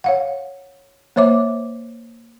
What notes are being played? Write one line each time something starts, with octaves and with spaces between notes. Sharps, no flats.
C#5 F5 F#5
A#3 C5 C#5 E5 D6